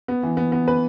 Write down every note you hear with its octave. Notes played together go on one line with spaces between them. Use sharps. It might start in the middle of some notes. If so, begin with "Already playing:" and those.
B3
E3
B3
B3
B4